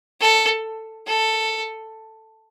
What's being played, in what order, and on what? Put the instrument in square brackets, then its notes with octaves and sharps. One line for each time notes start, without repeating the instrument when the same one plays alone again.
[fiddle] A4
A4